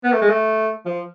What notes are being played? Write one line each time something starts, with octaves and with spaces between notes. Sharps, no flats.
B3
A3
G#3
A3
F3